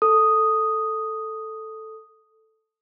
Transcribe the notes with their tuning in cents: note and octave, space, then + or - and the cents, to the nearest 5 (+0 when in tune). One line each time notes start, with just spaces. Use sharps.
A4 +0 D#6 +0